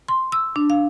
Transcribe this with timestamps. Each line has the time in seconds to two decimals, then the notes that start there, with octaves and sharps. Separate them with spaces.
0.08 C6
0.32 E6
0.56 D4
0.70 F5